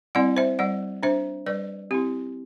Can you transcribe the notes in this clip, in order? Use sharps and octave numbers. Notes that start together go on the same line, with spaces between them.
G3 C4 E4 D5 F#5
C5 E5
G3 D5 F#5
D4 C5 E5
G3 B4 D5
C4 E4 G4